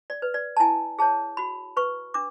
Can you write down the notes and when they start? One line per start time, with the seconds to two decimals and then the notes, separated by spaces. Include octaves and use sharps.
0.10 D5
0.22 B4
0.34 D5
0.57 A5
0.60 E4 G#5
0.99 G#4 C#5 A5
1.37 F#4 B5
1.77 B4 C#6
2.14 D4 D6